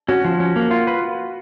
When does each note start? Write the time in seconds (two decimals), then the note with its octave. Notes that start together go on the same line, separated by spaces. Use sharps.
0.08 C#4 F#4
0.24 F3
0.40 C#4
0.56 A#3
0.71 F4
0.87 B4